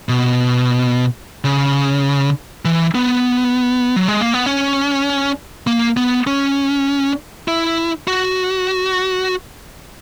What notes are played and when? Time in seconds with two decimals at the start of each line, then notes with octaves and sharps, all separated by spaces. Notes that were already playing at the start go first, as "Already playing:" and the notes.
0.09 B2
1.44 C#3
2.65 E3
2.95 B3
3.96 F#3
4.08 G#3
4.21 A#3
4.34 B3
4.46 C#4
5.67 A#3
5.97 B3
6.27 C#4
7.48 E4
8.08 F#4